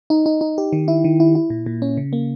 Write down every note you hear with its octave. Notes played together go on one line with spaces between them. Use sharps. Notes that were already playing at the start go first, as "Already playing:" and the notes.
D#4
D#4
D#4
G4
D#3
E4
D#3
E4
E4
A#2
A#2
C#4
C#3
A#3